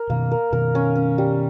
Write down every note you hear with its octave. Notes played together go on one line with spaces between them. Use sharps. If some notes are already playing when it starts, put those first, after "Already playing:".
Already playing: A#4
B2 D#3 A#3
A#4
B2 D#3 A#4
C#4
C#4
G3